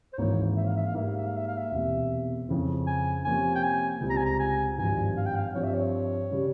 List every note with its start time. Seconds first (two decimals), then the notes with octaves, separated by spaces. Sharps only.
0.13 C5
0.18 G#1 G#2 E3 A#3 E4 C#5
0.56 E5
0.67 F5
0.76 E5
0.87 F5
0.94 G#2 G3 A#3 E5
1.07 F5
1.17 E5
1.27 F5
1.37 E5
1.47 F5
1.58 E5
1.71 E1 E2 C3
2.48 F2 C#3 F3 C4 E4
2.87 G#5
3.24 C3 F3 A#3 C#4 G#5
3.55 G5
3.63 G#5
4.00 C#2 C3 G3 C4 F4
4.09 A#5
4.17 G#5
4.25 A#5
4.39 G#5
4.78 G#1 G2 F3 G#5
5.17 F5
5.26 G5
5.36 F5
5.54 G2 F3 C4 F4 C#5
5.63 E5
5.73 C#5
6.31 C#3 G3 C#4 G4